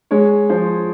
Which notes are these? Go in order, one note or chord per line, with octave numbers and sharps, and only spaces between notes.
G#3 C#5
F3 C5